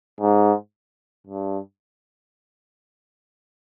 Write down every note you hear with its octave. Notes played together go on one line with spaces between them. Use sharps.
G#2
G2